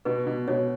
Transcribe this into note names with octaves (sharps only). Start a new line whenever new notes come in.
B2 B4
B2
B2 C#5